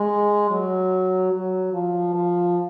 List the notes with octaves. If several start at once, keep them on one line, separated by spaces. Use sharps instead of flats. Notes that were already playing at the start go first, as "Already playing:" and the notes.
Already playing: G#3
F#3
F#3
F3
F3